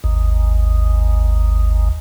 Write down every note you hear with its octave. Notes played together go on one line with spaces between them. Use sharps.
G#1 D#2